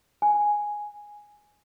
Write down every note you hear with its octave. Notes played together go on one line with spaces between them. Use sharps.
G#5